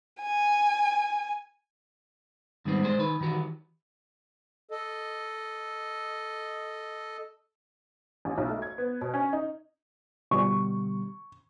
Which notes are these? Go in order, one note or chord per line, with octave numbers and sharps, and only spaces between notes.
G#5
G#2 D#3 G3 B3 C4
G#3 D4 C5
D#3 B4
D#3 E3 F#4 G4
A4 D#5
A1
B1
A3
G#6
B3
B2
C#4
D#4
B2 D3 G3 C#6